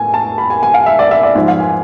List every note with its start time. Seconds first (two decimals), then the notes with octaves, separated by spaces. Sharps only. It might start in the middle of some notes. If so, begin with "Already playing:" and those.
Already playing: A2 G#5
0.14 A5
0.38 B5
0.50 G#5
0.63 G#5
0.74 F5
0.86 E5
0.99 D5
1.11 E5
1.23 D5
1.35 G#2 F3
1.48 F5
1.60 G#5